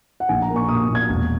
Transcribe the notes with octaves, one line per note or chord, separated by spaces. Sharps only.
F#5
A#1 G#5
A#5
A#3
C#6
A#2 D#6
A#2
G#6
E1